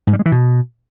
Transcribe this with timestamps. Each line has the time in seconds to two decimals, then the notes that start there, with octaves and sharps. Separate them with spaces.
0.07 G#2
0.13 G3
0.19 G#3
0.26 E3
0.32 B2